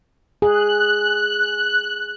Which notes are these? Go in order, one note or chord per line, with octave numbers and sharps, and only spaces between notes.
G#4 F#6